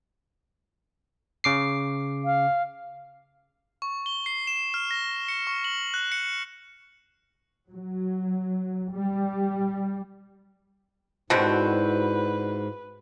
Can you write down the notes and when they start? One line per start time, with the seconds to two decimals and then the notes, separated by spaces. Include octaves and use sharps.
1.44 C#3 D6 C7
2.25 F5
3.82 C#6
4.06 G7
4.26 C7
4.47 E7
4.74 F6
4.91 A#6
5.28 C#7
5.47 C#6
5.64 F#7
5.94 F#6
6.12 C#7
7.70 F#3
8.92 G3
11.30 G#2 B2 D3 C4 E4 F#4 G4 B4